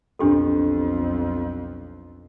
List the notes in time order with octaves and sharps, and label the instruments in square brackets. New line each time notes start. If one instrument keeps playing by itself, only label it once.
[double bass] B1 F2 [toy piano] D4 G4 A4